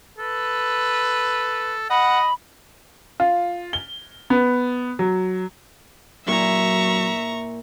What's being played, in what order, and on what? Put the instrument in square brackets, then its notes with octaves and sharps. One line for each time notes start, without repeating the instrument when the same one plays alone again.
[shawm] A4 [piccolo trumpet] B4
[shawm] D#5 [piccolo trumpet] F#5 [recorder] B5
[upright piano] F4
G7
B3
F#3
[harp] A#2 E4 A#4 [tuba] F#3 [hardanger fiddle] E5 [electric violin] A#5 C#6